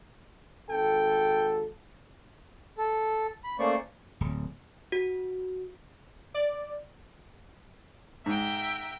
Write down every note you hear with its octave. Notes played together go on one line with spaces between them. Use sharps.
G#1 A4 G5
A4
B5
A3 A#3 C#4 C5 D5 C#6
D1
F#4
D5
G#2 E5 G5 A#5